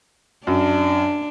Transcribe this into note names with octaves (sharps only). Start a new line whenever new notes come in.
F#2 D4